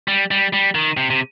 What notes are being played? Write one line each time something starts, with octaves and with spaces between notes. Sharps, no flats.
G3
G3
G3
D#3
C3
C3